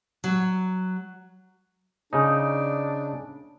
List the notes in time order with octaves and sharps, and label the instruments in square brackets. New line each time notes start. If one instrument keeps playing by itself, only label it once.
[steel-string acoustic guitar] F#3
[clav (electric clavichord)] C#3 D#4 [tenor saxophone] D4